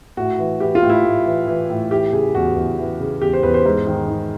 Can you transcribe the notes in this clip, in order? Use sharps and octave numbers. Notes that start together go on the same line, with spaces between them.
A2 F#4
E3
E3 G4
F4
A2
E4
A2
E3
E3
A2
E3 G4
C#3 G#4
E2 F#4
E2
E3
C#3
E2 G4
C5
E2 B4
C5
G#2
D#3
D#3